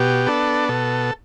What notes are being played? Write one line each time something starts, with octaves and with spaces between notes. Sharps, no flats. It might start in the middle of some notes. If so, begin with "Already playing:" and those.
Already playing: B2 G4
B3 D4 A4
B2 A4